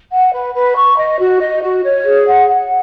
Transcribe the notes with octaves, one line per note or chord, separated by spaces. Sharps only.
F#5
B4
B4
C#6
D#5
F#4
D#5
F#4
C#5
G#4
F#5
F#5